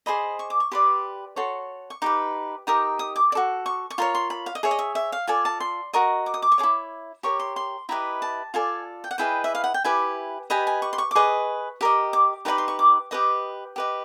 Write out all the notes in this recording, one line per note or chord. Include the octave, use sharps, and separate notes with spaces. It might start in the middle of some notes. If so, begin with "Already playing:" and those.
G#4 C5 D#5 B5
C#6
D6
C#6
G4 B4 D5 C6
F#4 A4 C#5 C6
C#6
D#4 G4 B4 D6
D#4 G4 A#4 D#6
D#6
D6
D5
F#4 A4
C#6
C#6
F4 A#4 C#5 C6
C6
B5
F5
D#5
G#4 C#5 E5
D#5
E5
E5
F5
F4 A4 D5 G#5
A5
C6
F#4 A#4 D#5 C#6
D6
D#6
D6
C#6
G#4 C#5 D6
E4
G4 A#4 C#5 C#6
C6
C6
E4 G4 B4 D#5 A#5
A5
F4 A4 D5 G#5
G5
F#5
E4 G#4 B4 D#5 G5
E5
F5
F#5
G5
E4 G4 B4 G#5
G4 B4 D#5 G#5
G#5
C#6
C6
C#6
D6
G#4 B4 D#5 C#6
G4 A#4 D#5
D6
D#4 G4 B4 D5 B5
C6
C#6
D6
G4 B4 D#5 D#6
G4 B4 D#5